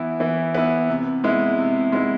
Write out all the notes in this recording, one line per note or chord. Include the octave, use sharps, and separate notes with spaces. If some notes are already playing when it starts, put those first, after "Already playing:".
Already playing: E3 B3 E4
E3
B3 E4
C3
G#3 B3 E4
C3
G#3 B3 E4